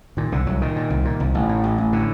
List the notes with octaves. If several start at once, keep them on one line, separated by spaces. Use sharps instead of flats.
A#2 D#3
C2 D3
C2 F#3
A#2 D#3
A#2
C2
A#2
C2
A1
A2
A1
A1
A2 D3